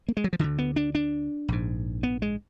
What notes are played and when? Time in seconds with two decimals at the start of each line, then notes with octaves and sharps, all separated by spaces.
0.08 A#3
0.17 G#3
0.24 F#3
0.33 F3
0.39 D2 D3 D#3
0.58 B3
0.76 D4
0.95 D4
1.48 A#1 G#2
2.03 B3
2.22 G#3